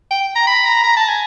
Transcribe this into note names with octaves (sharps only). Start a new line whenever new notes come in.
G5
A#5
B5
A#5
A#5
A5
G#5